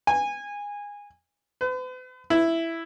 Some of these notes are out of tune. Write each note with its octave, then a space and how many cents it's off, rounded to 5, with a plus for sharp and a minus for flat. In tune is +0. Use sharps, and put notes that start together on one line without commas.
G#5 -20
B4 +45
E4 +5